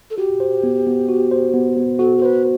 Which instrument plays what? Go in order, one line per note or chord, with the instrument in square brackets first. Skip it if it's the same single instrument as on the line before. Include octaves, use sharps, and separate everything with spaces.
[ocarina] A4
[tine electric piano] F#4 [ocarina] G4
[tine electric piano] C5
B3
B3
F#4
C5
B3
B3
[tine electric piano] F#4 [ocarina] A4
[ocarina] A4
[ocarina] B4 [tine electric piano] C5